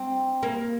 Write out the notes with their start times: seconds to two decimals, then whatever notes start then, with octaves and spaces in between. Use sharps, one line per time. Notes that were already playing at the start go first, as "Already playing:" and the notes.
Already playing: C4
0.43 A#3